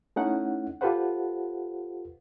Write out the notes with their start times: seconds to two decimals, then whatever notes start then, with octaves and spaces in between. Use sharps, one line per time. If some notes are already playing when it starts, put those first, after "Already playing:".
0.16 A3 C#4 D#4 E4 F#5
0.81 F4 G4 A4 B4 C5 F#5